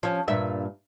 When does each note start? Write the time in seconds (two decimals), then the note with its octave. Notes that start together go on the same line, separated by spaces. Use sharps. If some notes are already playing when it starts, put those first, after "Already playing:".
0.03 F3 C#4
0.28 G2 A#2 E5